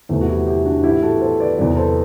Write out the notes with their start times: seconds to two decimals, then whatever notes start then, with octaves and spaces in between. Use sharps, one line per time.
0.09 E2 C3 E3 A3
0.21 F#4
0.28 E4 G4
0.47 E4 G4
0.65 D4 F#4
0.84 A2 E3 E4 G4
1.03 F#4 A4
1.21 A4 C5
1.39 B4 D5
1.58 E2 C3 F#3 B4 D5
1.76 A4 C5